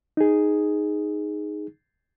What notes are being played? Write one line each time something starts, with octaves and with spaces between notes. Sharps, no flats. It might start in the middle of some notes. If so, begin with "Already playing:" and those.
D#4 G#4